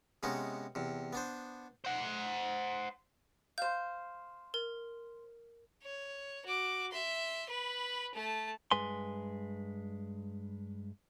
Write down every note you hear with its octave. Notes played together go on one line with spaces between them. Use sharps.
C3 G#3 B3 C#4 D#4
E2 C3
B3 D4 C5
C5 F#5
C5 F5 G6
A#4
C#5
F#4 D6
E5 C6
B4 B5
A3 A5
G2 G#3 B4 G#5 C6